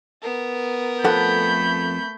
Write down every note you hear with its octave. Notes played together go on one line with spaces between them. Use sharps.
B3 A#4
F2 A3 A4 F#5 B5 G6